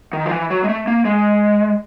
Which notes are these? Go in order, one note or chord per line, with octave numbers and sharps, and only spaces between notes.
D#3
F3
E3
F#3
G#3
A3
A#3
G#3